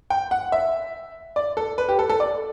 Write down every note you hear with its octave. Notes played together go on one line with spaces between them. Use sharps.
G5
F#5
E5
D5
A4
B4
G4
A4
A4
D5